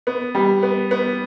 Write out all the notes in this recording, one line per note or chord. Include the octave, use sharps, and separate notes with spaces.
B3
G3
B3
B3